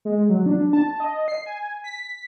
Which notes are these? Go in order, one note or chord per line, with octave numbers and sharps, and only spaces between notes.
G#3
F#3
D4
A5
D#5
C7
G#5
B6